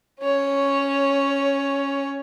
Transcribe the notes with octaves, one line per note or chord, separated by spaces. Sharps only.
C#4 C#5